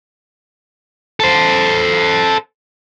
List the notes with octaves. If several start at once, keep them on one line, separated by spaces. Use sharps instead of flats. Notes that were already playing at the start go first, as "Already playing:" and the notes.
A4 C5